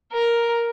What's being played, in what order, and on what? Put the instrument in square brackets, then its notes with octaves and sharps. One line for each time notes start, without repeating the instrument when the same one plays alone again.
[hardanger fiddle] A#4